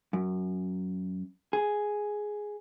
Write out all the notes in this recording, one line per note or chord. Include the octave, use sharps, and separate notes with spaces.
F#2
G#4